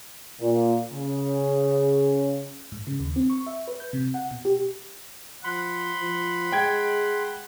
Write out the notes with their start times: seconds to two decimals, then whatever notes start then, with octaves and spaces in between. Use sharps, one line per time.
0.40 A#2
0.92 C#3
2.72 G#2
2.87 C#3
3.00 D#2
3.16 C4
3.30 C#6
3.47 E5
3.68 B4
3.80 G6
3.93 C3
4.14 F#5
4.31 B2
4.45 G4
5.44 F3 F#5 B5 C6
5.99 F3
6.52 G#3 G5 G#6